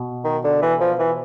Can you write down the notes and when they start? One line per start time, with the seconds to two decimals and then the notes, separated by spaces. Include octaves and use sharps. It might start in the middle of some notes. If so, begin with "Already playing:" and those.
Already playing: B2
0.24 D#3
0.44 D3
0.62 E3
0.80 F3
0.99 E3